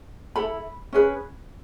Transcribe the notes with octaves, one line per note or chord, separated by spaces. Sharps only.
E4 A4 B5
C#4 G#4 B4